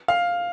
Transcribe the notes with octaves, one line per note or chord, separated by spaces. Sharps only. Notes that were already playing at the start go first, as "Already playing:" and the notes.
F5